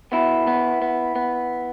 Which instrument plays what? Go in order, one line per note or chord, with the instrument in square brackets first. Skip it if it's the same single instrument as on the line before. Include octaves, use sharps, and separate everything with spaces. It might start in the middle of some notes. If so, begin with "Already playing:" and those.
[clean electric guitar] B2 B3 E4
B3
B3
B3